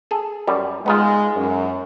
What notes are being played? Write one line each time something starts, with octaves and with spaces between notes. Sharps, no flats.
G#4 A4
F#2 G3
G#3 B3 D#4 F4
F#2